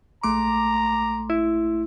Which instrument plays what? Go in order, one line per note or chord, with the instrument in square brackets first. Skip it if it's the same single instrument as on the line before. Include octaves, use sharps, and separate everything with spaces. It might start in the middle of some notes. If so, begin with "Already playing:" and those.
[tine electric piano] A#1 A3 C6 [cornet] A#5 [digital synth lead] D6
[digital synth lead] E4